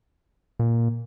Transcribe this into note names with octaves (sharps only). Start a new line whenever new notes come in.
A#2